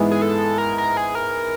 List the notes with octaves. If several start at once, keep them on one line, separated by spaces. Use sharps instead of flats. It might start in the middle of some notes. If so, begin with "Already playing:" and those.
Already playing: G#2 E3 G#3 B3 E4
G#4
A4
A#4
A#4
G#4
A#4